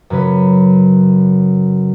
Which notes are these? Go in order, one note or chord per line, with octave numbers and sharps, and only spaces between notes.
F#2 C#3 B4